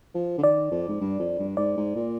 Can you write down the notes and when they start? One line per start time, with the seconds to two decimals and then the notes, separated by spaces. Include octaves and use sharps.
0.15 F3
0.38 D3
0.43 D#3 D5
0.71 F2
0.88 G#2
1.00 G2
1.19 F2
1.39 G2
1.57 G#2 D5
1.77 G#2
1.96 A#2